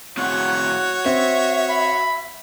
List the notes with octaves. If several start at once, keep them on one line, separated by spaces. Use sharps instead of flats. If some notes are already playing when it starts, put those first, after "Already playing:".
A2 C4 F#4 C#5 F#5
C4 E5
B5